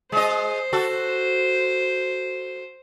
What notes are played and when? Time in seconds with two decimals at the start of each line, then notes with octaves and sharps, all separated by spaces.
0.12 G#3 C5 D#5
0.73 F#4 A4